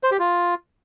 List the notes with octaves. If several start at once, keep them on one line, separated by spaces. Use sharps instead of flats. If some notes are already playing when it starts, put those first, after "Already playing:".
C5
G4
F4